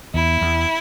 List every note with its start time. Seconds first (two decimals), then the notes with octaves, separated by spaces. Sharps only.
0.14 E2 E4
0.41 E2